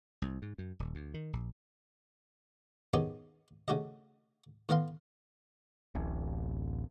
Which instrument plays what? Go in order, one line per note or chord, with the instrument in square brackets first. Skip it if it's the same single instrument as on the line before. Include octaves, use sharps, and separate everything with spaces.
[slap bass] C2
G#2
F#2
D#1
D2
D#3
A#1
[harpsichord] D#3 B3 C#4 D#4 G4 G#4
C#3 A3 F#4 G4 D#5
A2 E3 B3 A#4 F5 C6
[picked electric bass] D1 A1